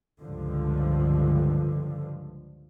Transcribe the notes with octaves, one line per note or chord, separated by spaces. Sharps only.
C#2 G2 D3 F3